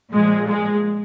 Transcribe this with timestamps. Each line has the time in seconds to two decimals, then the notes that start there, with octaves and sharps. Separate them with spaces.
0.12 A#2 F3 G#3
0.48 G#3